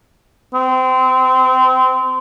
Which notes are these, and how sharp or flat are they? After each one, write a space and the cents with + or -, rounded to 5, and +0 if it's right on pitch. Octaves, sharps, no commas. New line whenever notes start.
C4 -25